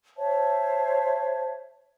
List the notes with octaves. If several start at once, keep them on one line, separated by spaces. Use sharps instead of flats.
C5 C#5 E5 A5